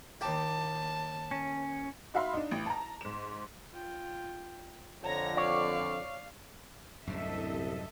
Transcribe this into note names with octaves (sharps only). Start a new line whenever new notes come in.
D#2 G4 A5
C#4
D#4 F#4 E5 F5 B5 C6
D4 D#4
A1
A5 A#5
G#2 E7
F4 G5
F2 D3 C#5 A#5 A#6
C#5 D5 F5 C#6
C2 F#2 A2 D3 A4 D#5 E5